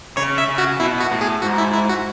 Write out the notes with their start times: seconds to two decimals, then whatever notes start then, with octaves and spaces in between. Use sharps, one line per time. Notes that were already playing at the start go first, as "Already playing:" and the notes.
0.17 C#3 C#5
0.38 E5
0.48 C#3
0.58 F#4
0.80 B2 E4
1.00 F#4
1.11 A2
1.21 G#4
1.42 G#2 F#4
1.58 E4
1.74 E4
1.89 F#4